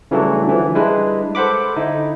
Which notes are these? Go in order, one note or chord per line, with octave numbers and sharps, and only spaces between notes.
C#3 E3 F#3 G3 A3 D4
D3 E3 F3
G3 G#3 D4 E4 B4
A4 C5 F#5 B5 D6
D3 D#4 E4